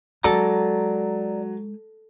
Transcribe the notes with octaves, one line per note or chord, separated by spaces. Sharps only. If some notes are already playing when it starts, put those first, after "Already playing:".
F#3 G#3 A4 D5 A#5